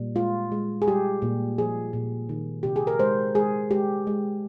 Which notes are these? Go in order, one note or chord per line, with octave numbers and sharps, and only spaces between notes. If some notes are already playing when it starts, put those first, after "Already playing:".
Already playing: A#2 G3
G#3 F4
G#3
G#4
G3 G4
A#2
F3 G#4
A#2
D#3
C3 G4
G#4
A#4
G#3 C5
G#3 G#4
G#3 G4
G#3